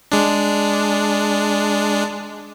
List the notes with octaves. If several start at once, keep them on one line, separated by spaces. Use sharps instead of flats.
G#3 D4